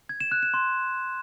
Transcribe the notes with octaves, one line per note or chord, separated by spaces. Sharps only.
G#6
E7
F#6
E7
C6